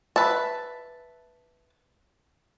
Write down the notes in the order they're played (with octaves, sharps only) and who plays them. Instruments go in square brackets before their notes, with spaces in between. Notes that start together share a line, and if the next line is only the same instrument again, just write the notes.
[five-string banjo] B4 E5 A5